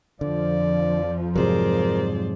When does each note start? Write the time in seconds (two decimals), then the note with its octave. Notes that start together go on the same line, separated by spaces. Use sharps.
0.21 F2 D3 F3 D5
1.36 G#2 C3 F#3 G#4 A#4 C5 D5